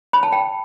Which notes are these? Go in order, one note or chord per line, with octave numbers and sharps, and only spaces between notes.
B5
A5
G5